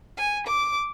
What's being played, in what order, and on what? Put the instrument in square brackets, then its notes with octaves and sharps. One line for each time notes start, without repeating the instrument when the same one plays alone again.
[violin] G#5
D6